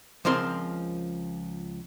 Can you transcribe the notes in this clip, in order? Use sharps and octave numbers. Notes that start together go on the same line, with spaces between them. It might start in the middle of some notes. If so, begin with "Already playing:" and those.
C#2 F3 C4 A#4 C6